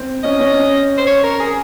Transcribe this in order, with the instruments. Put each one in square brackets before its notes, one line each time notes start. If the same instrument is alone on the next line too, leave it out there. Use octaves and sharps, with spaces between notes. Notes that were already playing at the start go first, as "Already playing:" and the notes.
Already playing: [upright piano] C4
[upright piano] C#4 [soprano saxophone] D#5
[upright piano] C#4
[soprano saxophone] C5
C#5
A#4
G#4